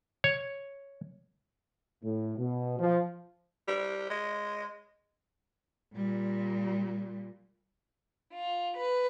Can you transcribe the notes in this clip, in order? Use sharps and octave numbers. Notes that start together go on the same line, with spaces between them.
C#5
A2
B2
F3
G3
G#3
A#2 G3
F4
B4